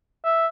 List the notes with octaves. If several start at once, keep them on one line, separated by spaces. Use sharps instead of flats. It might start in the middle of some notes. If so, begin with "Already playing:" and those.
E5